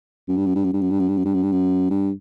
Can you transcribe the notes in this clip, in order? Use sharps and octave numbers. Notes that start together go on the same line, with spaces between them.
F#2
G2
F#2
G2
F#2
G2
F#2
G2
F#2
G2
F#2
G2
F#2
G2
F#2
G2